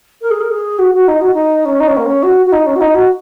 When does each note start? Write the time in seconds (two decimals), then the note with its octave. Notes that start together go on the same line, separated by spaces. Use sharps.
0.21 A#4
0.30 G#4
0.40 A#4
0.50 G#4
0.78 F#4
0.93 F#4
1.08 D#4
1.21 F#4
1.34 D#4
1.65 C#4
1.80 D#4
1.88 C#4
1.96 A#3
2.05 C#4
2.23 F#4
2.46 F#4
2.52 D#4
2.66 C#4
2.75 F#4
2.80 D#4
2.94 F#4